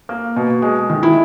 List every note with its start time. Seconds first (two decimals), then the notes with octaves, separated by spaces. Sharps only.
0.09 A#3
0.36 B2
0.62 G#3
0.90 D#3
1.03 E4